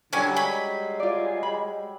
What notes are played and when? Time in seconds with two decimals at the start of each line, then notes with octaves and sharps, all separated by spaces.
0.13 D3 F#3 G3 C#4 G#5
0.37 G#3 B5
1.00 F4 D5
1.43 B5